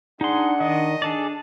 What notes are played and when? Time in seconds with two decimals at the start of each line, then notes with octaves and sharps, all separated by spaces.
0.21 D4 D#4 G#4 F#5 C6
0.60 D#3 D#5
1.02 D4 G#4 A4 D5